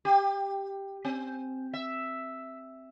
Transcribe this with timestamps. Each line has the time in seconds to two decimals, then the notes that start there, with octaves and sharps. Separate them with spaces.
0.05 G4
1.05 C4
1.73 E5